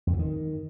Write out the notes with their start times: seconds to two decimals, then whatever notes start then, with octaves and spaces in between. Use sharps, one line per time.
0.07 F2
0.13 E3
0.19 D#3